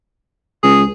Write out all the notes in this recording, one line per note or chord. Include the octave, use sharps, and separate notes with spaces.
C#2 G#4